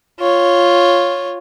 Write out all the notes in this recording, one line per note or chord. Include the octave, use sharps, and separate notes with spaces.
F4 C#5